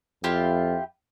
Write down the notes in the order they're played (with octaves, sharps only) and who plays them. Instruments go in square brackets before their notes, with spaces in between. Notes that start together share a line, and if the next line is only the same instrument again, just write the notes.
[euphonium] F2 [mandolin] E4 F4 G4